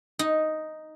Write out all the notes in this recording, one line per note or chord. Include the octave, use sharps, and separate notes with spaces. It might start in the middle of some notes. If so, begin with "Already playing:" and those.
D#4